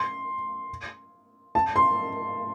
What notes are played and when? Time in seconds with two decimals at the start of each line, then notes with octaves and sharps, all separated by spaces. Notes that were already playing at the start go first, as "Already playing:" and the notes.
Already playing: C6
1.55 A5
1.76 C6